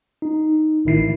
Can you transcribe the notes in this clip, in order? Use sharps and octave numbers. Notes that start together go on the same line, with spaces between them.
D#4
A1 D#3 E4 C7